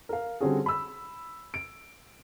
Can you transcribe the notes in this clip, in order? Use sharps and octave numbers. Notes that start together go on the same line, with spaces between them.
A#4 F5
D3 G3 C4 C#4 F#4 G#4
B5 E6
D7